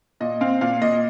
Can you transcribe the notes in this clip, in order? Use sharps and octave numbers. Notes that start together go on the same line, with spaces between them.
A#2 D#5
C4 F5
A#2 F5
A#2 D#5